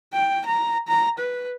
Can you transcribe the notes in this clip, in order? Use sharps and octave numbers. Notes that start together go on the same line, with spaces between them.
G5
A#5
A#5
B4